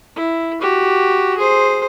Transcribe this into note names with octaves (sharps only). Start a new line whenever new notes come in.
E4
F#4 G4
G#4 C5